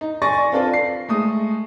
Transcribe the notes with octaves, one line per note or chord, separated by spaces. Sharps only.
D#4
D5 G#5 C6 C#6 A6 A#6
C4 D4 F4 A4 B4 D5
C7
G#3 A3 D#6